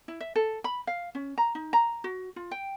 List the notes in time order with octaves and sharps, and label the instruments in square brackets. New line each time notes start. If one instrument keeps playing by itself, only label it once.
[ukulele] E4
E5
A4
B5
F5
C#4
A#5
D#4
A#5
F#4
F4
G5